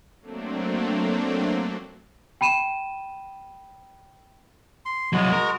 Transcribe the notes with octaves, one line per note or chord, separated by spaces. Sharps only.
F#3 A3 A#3 C4 D4
G5 B5 D#7 E7
C6
C2 F#3 G#3 F#4
A#4